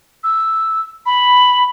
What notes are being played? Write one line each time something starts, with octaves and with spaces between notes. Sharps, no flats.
E6
B5